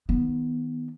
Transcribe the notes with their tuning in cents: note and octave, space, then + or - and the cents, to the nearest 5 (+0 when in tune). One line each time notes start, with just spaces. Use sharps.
D#3 +20 B3 +0